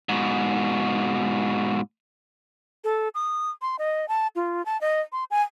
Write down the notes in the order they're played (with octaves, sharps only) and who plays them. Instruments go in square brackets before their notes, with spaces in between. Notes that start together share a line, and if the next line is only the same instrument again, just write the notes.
[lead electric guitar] G#2 B2
[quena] A4
D#6
C6
D#5
A5
F4
A5
D#5
C6
G#5